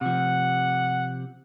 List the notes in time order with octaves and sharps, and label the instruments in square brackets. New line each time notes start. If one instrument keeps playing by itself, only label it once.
[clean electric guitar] C3 F3 [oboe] F#5